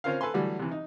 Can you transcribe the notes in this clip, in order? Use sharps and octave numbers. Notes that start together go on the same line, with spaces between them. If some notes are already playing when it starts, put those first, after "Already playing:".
C4 C#4 F4 A#4 C5 F5
A4 B4 G#5 C6
D3 E3 F#3 G3 A3
C3 E3
D#4